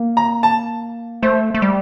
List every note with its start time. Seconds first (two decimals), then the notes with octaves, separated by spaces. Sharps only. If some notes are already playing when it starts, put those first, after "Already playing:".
Already playing: A#3
0.17 A#5
0.43 A5
1.22 A3 C5
1.54 A3
1.62 G3